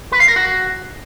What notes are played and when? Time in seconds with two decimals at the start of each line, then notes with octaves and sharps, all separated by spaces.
0.12 B4
0.20 F5
0.28 A#4
0.36 F#4